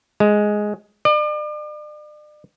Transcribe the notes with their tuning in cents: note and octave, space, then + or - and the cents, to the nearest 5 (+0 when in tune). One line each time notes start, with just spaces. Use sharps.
G#3 +5
D5 +40